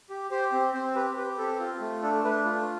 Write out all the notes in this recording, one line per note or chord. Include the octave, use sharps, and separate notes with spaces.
G4
G4 C5
C4
C4 C5
G4 B4
G4 B4
C4 A4
F4
A3
D4 A4
A3 B4
F4